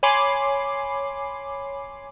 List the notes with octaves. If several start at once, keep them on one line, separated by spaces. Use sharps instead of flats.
C#5 G#5 B5 C6 D6 C7